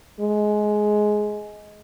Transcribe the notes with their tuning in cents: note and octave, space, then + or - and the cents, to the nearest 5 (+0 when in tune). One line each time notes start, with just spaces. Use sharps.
G#3 +15